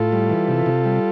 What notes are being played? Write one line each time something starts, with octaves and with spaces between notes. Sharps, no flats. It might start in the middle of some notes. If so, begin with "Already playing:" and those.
Already playing: A2 F4 A4
G3
E3
C3
C3
G3